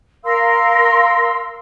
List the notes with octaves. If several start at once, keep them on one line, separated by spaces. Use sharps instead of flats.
A#4 F5 C6 E6